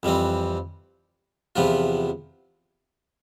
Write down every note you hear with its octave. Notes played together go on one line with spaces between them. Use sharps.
F2 E3 G3 C4
E2 C3 F3 B3 F4